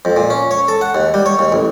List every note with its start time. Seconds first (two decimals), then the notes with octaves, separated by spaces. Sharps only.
0.05 F2
0.17 A#2
0.30 C#4
0.51 C#5
0.68 A4
0.81 F#5
0.95 D#2
1.14 G3
1.26 C#5
1.39 D#2
1.52 A1